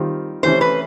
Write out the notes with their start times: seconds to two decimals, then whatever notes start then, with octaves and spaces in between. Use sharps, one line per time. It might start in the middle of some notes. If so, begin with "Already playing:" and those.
Already playing: D#3 G3 C4 F4
0.43 C3 E3 A3 C#4 C5
0.61 B4